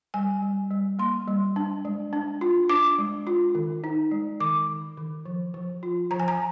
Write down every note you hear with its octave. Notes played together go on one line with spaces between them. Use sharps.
G3 G#5
G3
G3
A#3 C6
G3
D4
G#3
D4
F4
D4 D6
G#3
F4
D#3
D#4
G#3
D#3 D6
D#3
D#3
F3
F3
F4
F3 A#5
G#5
A#5